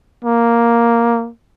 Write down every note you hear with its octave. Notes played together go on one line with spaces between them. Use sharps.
A#3